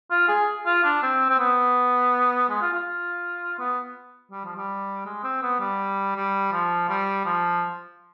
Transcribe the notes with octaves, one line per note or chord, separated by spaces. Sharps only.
F4
G#4
F4
D4
C4
C4
B3
G#3
F4
F4
B3
G3
F3
G3
G#3
C4
B3
G3
G3
F3
G3
F3